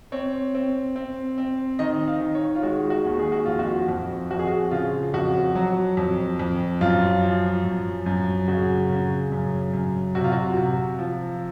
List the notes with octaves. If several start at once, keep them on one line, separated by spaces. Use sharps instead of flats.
C4 C#5
C4
C4
C4
D#3 D#5
F5
D#3
C#5
F4
G#3 F#4
F#4
D#2
G#4
F#4
F2 F4
F#4
F2
F2 F#4
G#4
F#4
C#3 F4
F2 F#4
F#3
F2
F2
F#2 F4
F3
F#2
F#2
C#3 F#4
C#3
F#2
F#2
C3 F#4
F4
F#4
C3
F3